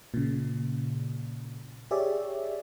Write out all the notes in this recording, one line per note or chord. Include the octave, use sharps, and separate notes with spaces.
A#2 C#3
G4 G#4 C#5 D5 E5